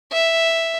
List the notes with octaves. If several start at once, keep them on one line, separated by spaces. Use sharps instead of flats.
E5